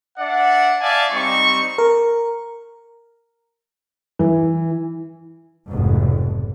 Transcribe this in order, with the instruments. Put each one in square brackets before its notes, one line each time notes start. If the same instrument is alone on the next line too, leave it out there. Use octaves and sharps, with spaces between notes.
[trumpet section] D4 D5 E5 F#5
D5 E5 F5 G#5 A5
G3 C4 D#4 C#6
[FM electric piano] A#4
[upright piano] E3
[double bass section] F1 B1 G#2